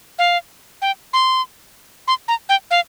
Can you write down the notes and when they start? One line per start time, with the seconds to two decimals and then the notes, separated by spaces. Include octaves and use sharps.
0.19 F5
0.82 G5
1.13 C6
2.08 C6
2.28 A#5
2.49 G5
2.71 F5